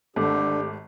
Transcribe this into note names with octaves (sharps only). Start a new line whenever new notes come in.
G#1 D3 A3 G4